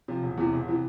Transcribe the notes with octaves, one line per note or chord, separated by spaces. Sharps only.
C3 F3
E1
E2 C3 E3
E1
C3 E3